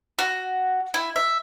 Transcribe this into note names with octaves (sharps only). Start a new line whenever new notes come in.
F#4
E4
E5